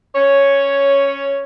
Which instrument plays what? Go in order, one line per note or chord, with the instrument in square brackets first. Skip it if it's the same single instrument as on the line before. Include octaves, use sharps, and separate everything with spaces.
[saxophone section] C#4 C#5